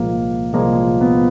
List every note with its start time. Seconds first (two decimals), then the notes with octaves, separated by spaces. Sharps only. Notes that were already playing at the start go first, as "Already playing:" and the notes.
Already playing: C2 A#2 F3 G#3 A#3
0.54 C2 A#2 F3 G#3 A#3
1.01 B3